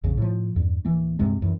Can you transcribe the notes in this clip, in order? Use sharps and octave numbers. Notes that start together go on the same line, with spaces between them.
A#1 F2 C#3
A2 F3
E2 G2
D1 E3 A#3
C#2 G2 C3 G#3
F#2 E3